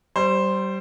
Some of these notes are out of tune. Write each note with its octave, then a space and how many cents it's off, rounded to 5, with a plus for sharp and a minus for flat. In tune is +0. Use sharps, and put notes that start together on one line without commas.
G3 -25 C5 +0